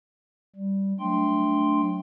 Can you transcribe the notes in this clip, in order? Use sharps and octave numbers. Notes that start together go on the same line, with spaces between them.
G3
F#3 A3 D4 G5 C6